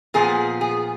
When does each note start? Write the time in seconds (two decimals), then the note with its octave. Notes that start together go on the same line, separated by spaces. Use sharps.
0.14 A#2 F3 B3 G#4
0.61 G#4